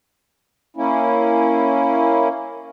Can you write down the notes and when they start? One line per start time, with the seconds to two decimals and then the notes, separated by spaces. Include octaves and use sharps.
0.77 A#3 C#4 E4